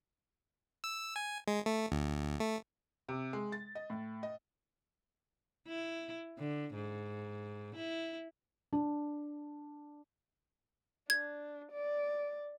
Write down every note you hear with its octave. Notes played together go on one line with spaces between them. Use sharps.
E6
G#5
G#3
A3
D2
A3
C3
G#3
A6
D#5
A2
D#5
E4
D3
G#2
E4
D4
D4 G#6
D5